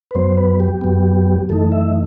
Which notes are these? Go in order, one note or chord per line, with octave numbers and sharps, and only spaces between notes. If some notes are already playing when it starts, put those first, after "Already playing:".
B4
F#2 F#3 B3 C5
B4
G4
F#2 F#3 B3
F#2 E3 A3 D#4 A4
E5